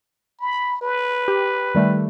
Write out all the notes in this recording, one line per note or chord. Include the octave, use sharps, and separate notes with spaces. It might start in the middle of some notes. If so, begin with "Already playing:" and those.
B5
B4
G4
D#3 G3 A3